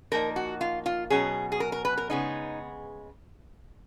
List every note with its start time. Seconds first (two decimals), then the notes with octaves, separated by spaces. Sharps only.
0.11 A#2 F3 A#3 D#4 A#4
0.36 F#4
0.61 F4
0.86 F4
1.10 B2 F#3 C#4 G#4
1.52 G#4
1.60 A#4
1.72 A#4
1.85 B4
1.97 A#4
2.10 C#3 G#3 B3 D#4